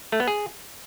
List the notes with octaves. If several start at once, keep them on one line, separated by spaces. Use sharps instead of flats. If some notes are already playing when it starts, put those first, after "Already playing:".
A3
B3
G#4